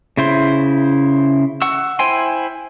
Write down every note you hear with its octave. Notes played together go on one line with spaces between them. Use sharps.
C#3 E4 C5
F#5 C#6 E6
E4 C5 G5 G#5 C6